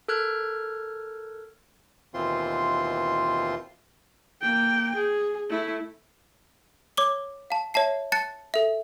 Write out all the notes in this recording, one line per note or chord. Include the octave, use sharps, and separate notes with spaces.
A4 A#4 F6 F#6 G#6
D#2 B2 E3 C4 F4 C6
A#3 G5
G#4
A3 E4
C#5 D6 G7
F5 A5
C#5 E5 A5 C7
A5 F#6 A6 C#7
A4 E5